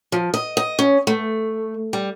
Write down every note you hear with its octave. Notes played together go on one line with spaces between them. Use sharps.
F3
D#5
D#5
C#4
A3
G3